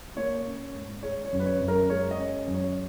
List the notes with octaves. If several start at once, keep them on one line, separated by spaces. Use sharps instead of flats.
A#3 C#5
C#4
G#2
G#3 C#5
C#5
F#2
B4
C#5
F#2
A#4
G#3 C#5
D#5
C#4
F#2
C#5